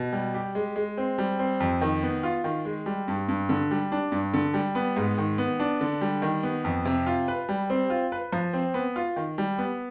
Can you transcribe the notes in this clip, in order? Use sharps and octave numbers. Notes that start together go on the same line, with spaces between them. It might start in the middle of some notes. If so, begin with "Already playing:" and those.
Already playing: B2
G3
G4
G#3
G#3
C4
G3
C4
F2
D#3
B3
F4
D#3
G#3
G3
G2
G2
D3
G3
D4
G2
D3
G3
B3
G#2
D#3
B3
D4
D3
G3
D#3
B3
F2
C3
F4
B4
G3
C4
F4
B4
F3
C4
B3
F4
D#3
G3
B3